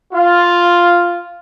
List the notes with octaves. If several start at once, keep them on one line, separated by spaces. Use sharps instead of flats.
F4